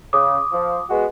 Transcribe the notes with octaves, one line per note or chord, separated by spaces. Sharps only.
C#3 D6 D#6
F3
G#3 B3 F#4